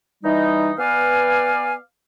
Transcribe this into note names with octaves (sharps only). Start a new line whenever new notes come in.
E3 G3 D#4
B3 B4 D5 F5 G#5